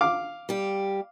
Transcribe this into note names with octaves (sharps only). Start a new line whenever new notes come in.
F5 D6
G3 G4